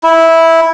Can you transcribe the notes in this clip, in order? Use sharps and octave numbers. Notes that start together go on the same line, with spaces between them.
E4